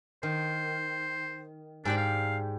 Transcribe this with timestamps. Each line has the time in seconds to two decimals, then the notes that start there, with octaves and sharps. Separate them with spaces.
0.23 D#3 C5
1.85 G#2 D4 G4 D5
1.97 F5